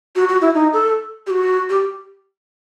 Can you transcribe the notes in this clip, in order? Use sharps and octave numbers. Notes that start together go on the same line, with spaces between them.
F#4
F#4
E4
D#4
A4
G4
F#4
G4